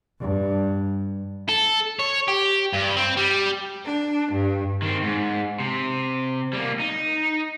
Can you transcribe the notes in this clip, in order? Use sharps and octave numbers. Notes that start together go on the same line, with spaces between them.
G2
A4
C#5
G4
G2
C4
G3
D4
G2
D#3 C4
G#2
C3
G3 A#3
D#4